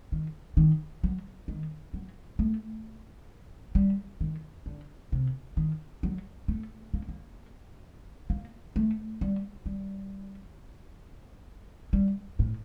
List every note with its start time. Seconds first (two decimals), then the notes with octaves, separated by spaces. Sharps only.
0.12 D#3
0.57 D#3
1.03 F#3
1.48 D#3
1.94 F#3
2.39 A3
3.75 G3
4.21 D#3
4.66 D3
5.12 C3
5.57 D#3
6.03 F#3
6.48 A3
6.94 A#3
7.09 A#3
8.30 A#3
8.76 A3
9.21 G3
9.66 G3
11.93 G3
12.39 A2